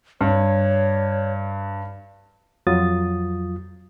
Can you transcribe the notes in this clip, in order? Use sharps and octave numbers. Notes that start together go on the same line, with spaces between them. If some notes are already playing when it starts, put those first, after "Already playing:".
G2 C#5
F2 F#3 F4 D#6 A6